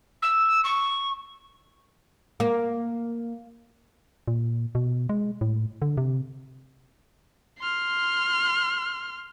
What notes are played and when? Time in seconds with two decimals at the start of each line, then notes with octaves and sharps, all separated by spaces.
0.22 E6
0.64 C#6
2.40 A#3
4.28 A#2
4.75 B2
5.09 G#3
5.41 A2
5.82 D3
5.97 C3
7.59 C6 F6